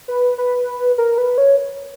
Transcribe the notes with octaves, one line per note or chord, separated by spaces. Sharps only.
B4
B4
A#4
B4
C#5